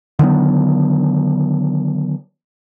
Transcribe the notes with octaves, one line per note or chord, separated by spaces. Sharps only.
D3 D#3 F#3 B3